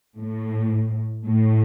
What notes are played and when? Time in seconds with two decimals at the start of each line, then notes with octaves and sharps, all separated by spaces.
0.19 A2
1.27 A2